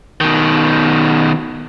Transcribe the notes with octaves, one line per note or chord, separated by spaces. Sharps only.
B2 D#3